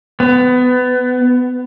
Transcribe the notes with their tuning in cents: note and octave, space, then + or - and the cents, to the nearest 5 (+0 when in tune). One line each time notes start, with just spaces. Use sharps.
B3 +25